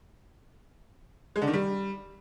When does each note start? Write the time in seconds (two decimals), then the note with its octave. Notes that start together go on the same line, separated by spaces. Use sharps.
1.36 G#3
1.42 D3
1.48 D#3
1.53 G3